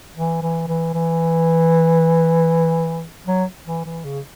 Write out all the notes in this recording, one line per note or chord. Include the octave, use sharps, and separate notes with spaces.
E3
E3
E3
E3
F#3
E3
E3
C#3